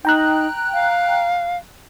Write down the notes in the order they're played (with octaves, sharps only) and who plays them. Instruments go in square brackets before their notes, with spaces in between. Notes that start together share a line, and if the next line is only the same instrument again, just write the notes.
[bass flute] D#4 [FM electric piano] G5 A#5 F#6
[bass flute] F5